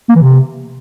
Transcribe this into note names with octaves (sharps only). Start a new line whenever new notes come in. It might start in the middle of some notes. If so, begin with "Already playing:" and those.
A#3
E3
C3